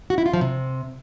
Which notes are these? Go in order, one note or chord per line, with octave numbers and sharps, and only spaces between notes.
F#4
E4
F4
F3
C3